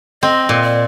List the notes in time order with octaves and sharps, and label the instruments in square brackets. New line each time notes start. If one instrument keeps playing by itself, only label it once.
[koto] C4 [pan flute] D#5
[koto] A#2
[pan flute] D5